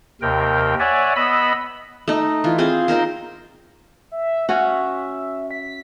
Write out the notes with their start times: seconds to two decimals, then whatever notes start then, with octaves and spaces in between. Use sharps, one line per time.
0.22 D#2 C3 A#4 G5
0.80 C#5 D5 E5 F#5 G#5
1.16 B3 D#5 B5 E6
2.08 A3 D#4
2.44 E3 F4
2.58 C4 F4 G#4 C5
2.88 C4 D#4 A#4 C5
4.12 E5
4.49 C#4 F#4 E5
5.51 B6